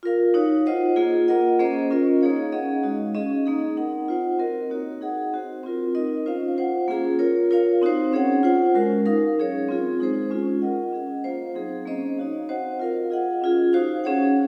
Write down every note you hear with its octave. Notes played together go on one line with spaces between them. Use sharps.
F4 A#4 F5
D#4 F#4 C#5
F4 C5 D#5 F#5
A#3 F4 G#4
A#3 F4 A#4 D#5 F#5
A#3 C#4 G#4 C5 D#5
C#4 F4 A#4 D#5
A#3 D#4 G#4 C#5 F5
C#4 G#4 D#5 F#5
G#3 D#4 F#4 C#5 F5
C#4 G#4 D#5
A#3 D#4 G#4
C4 D#4 A#4 D#5 F#5
F4 C5 F#5
C4 F#4 A#4 D#5
A#3 D#4 F#4 C#5
D#4 G#4 D#5 F#5
C4 F#4 C5
C4 F4 A#4
D#4 A#4 D#5
C#4 F4 C5 F5
F4 C5 F#5
A#3 C#4 F4 G#4
F4 A#4 C#5
F4 A#4 C#5 F5
C4 D#4 F#4 C5
C#4 G#4 C#5 F#5
F4 C5 F#5
G#3 C#4 F#4 A#4
D#4 A#4 F5
F#3 C#4 G#4 C#5
C4 F4 G#4
G#3 D#4 G#4 C5
G#3 C#4 F4 G#4
F4 A#4 D#5 F#5
C#4 G#4 D#5 F#5
A#3 F4 C5 F5
F#3 C4 D#4 G#4
A#3 C#4 G#4 C5 D#5
D#4 F#4 C#5 F5
C4 F#4 C5 D#5 F#5
F4 A#4 F5
F4 G#4 D#5 F#5
C#4 F4 G#4
D#4 F#4 C5 F5
C#4 G#4 C#5 F#5